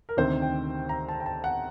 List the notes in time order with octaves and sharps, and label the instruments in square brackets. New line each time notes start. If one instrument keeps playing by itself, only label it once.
[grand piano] A#4
D2 C3 D#3 C5
G5
A#5
A5
G5
A5
F#5